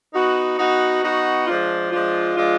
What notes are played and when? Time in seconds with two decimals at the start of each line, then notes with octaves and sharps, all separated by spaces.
0.13 B3 D#4 F#4
0.58 B3 D#4 F#4
1.02 B3 D#4 F#4
1.47 F3 G#3 D4 F4
1.91 F3 G#3 D4 F4
2.36 F3 G#3 D4 F4